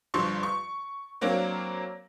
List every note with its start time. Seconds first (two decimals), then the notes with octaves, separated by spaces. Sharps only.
0.14 G1 G2 F3 C6 C#6
0.43 C#6
1.21 F#3 A#3 C4 D4 A#4 C#5